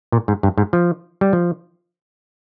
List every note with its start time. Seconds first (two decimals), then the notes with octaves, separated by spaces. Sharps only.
0.12 A#2
0.28 G#2
0.43 G2
0.58 G#2
0.73 F3
1.21 G3
1.33 F3